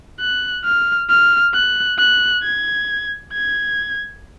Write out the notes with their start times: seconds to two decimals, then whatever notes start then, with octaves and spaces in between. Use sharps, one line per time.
0.20 F#6
0.64 F6
1.09 F6
1.53 F#6
1.98 F#6
2.43 G#6
3.33 G#6